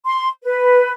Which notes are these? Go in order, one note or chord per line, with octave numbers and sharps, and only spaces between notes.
C6
B4